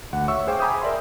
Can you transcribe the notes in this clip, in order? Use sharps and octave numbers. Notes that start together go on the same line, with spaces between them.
D2 F#5
C#5 E5 C#6 E6
G#4 C5 F5 G5 D6
G#5 A#5 B5 D6 D#6 G6
A#4 D5 E5 C6